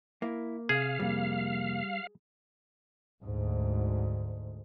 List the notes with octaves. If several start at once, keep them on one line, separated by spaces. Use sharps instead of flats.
A#3 E4
C3 G#4 F5
F2 C3 G3 A#3
D2 G#2